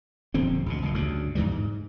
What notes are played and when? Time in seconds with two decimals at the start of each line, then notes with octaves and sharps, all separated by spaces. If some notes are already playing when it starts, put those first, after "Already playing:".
0.34 D#1 F2 D3 C4
0.66 A1 D2 B2
0.82 F#1 C#2 A#2
0.94 D2 G2 C#3
1.35 E2 G#2 E3 G3
1.52 G#2